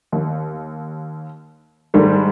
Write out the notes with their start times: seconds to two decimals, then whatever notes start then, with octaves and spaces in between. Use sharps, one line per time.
0.12 D#2
1.94 G#2 D#3 G3 A3